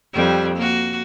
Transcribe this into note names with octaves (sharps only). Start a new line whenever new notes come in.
F2 G3
A#3 F#4